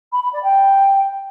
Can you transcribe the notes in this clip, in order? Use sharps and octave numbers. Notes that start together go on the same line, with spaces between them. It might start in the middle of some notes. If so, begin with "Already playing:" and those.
B5
B5
D5
G5